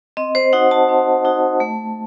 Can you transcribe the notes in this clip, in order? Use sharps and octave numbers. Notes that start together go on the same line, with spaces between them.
C4 D#5
C5
D#4 F#4 F#5
A5
C4
D#4 F#4
A3